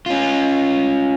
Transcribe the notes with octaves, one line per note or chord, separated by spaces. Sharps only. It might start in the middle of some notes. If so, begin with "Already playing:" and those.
C#4 F4